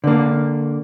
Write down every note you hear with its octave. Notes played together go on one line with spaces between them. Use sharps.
D3 A#3